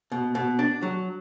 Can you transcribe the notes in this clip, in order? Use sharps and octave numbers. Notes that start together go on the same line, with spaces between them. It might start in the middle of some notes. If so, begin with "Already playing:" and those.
B2
B2
D4
F#3